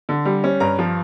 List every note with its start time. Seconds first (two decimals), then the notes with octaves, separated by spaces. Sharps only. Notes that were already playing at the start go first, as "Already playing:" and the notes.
0.09 D3
0.25 G3
0.44 C#4
0.60 G2 A#5
0.79 F3